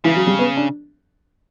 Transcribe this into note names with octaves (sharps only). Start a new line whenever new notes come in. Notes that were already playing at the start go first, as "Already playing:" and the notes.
C#3 E3
F#3
G3
B3
D4